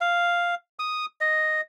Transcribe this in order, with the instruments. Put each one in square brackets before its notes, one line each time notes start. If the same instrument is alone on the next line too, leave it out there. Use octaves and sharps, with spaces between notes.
[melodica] F5
D#6
D#5